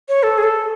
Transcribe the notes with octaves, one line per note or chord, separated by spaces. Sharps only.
C#5
A4
G#4
A4